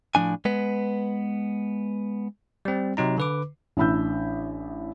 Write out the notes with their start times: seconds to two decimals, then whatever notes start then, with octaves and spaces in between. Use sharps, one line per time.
0.15 A2 F3 D4 G#5
0.45 G#3 B3 B4
2.65 G3 C4
2.97 C3 F#3 D#4 A#5
3.18 D3 B4 D6
3.77 A1 D4 E4 B5 E6 G6